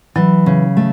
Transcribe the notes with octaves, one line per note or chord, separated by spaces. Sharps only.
E3 F#3
C#3
A3